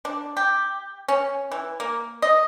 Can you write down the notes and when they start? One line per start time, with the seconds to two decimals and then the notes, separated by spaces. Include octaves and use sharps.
0.05 D4
0.37 G4
1.08 C#4
1.52 E3
1.80 A#3
2.22 D#5